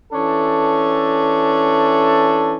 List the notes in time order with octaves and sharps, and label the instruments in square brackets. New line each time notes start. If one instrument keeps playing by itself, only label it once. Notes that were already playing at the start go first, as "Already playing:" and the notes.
[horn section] E3 C#4 D4 A4